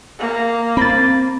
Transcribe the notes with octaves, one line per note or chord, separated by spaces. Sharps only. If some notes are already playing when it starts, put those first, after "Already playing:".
A#3
C4 B5 A6